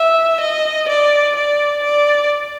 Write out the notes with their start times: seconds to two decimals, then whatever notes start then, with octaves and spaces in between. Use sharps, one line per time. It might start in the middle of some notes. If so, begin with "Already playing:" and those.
Already playing: E5
0.40 D#5
0.88 D5
1.36 D5
1.83 D5